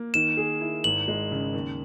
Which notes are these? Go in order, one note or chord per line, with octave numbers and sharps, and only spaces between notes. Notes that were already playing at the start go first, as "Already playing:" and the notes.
Already playing: A#3
D#3 E7
G#4
E4
G#1 F#7
G#3
C#3
D#2